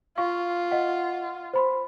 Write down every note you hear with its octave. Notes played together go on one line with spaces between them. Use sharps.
F4 F5 C#6
D#5 F#5
C5 B5 C6